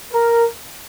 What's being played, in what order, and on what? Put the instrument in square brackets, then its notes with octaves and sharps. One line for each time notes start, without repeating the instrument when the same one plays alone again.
[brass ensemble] A#4